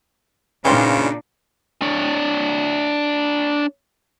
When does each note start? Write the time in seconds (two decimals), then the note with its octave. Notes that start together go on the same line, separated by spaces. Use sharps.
0.65 A#2 C#3 E3 C4 D4 D#4 F4
1.82 D4 C#5